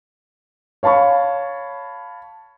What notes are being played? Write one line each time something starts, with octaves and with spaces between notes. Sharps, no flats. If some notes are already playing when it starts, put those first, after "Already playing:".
C#5 F5 A5 B5 C#6